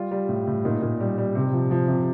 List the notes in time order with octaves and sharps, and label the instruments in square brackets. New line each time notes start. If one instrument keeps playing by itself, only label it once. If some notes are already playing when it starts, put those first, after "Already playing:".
Already playing: [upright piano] G3 F4
G3
A2
A2
A#2 D#4
A#2
G3
G3
C3
F3
F3
C3